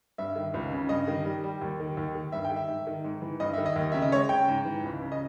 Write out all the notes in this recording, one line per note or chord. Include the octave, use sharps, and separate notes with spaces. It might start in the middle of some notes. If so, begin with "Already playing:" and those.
G2 E5
D#3
C#2
C#3
G2 D#5
D#3
G3
G3
D#2
D#3
D#2
D#3
G2 E5
G5
D#3
E5
G#2
D#3
G#2
E3
G2 D#5
D#3 E5
D#5
D#2
C#3 E5
D#5
G#3 C#5
C#3 G5
G#2
E3
C#2
C#3
D#5